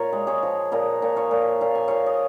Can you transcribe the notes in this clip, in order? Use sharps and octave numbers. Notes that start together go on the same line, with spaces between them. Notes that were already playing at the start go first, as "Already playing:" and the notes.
Already playing: A#2 F4 A#4 C#5
G#3
G#4 C#5
F3
A#2 A#4 D#5
A#2
C#5 F5
A#2
A#2 F5
G#5
A#2 C#5 F5
D#5 G#5